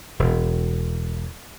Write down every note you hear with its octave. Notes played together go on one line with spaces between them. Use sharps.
E1